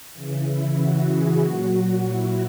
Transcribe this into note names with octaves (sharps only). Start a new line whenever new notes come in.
C#3 E3
E4
F#4
G#4
A#2 F#3 F#4
E4